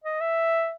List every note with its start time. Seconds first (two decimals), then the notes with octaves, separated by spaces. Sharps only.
0.04 D#5
0.21 E5